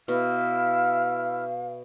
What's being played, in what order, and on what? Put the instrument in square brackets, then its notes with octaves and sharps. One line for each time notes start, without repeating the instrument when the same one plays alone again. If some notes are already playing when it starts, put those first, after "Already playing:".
[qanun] B2 [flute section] E4 F6 [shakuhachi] F5